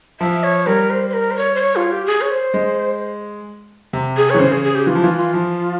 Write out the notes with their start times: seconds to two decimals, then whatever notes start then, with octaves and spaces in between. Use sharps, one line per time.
0.20 F3 E5
0.43 C#5
0.66 G3 A#4
0.90 C5
1.09 C5
1.13 A#4
1.31 C5
1.37 C#5
1.55 C5
1.60 C#5
1.76 F4
1.92 G4
2.06 G#4
2.21 C#5
2.30 C5
2.54 G#3
3.93 C3
4.17 G#4
4.30 E3 C#5
4.39 C#3 C5
4.52 G#4
4.63 G#4
4.75 G4
4.87 E3 F4
4.95 F3
5.02 E3 F4
5.17 F4
5.34 F3